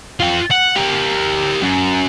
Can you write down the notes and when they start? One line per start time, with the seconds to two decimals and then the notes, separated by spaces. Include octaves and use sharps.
0.20 F4 G5
0.51 F#5
0.76 G4 A#4
1.62 F#2